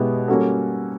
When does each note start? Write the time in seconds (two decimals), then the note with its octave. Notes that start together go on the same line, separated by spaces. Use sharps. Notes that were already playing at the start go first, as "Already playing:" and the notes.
Already playing: B2 G#3 B3 E4 G4
0.28 G3 A#3 C#4 F#4 A4